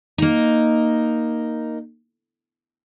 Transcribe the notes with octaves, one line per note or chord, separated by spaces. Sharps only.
A#3 D#4